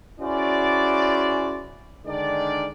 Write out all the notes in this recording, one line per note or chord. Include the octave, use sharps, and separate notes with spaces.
C#4 E4 F#4 G#4 C5 D5
D3 D#3 G#3 D4 D5